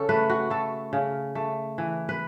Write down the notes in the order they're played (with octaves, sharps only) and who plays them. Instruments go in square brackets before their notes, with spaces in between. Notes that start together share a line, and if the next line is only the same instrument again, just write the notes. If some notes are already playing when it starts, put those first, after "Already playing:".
Already playing: [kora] C#3 C#4 A4
A3 B4
F#4
A3 A4
C#3
A3
E3
B4